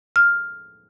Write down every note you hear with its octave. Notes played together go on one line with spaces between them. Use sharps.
F6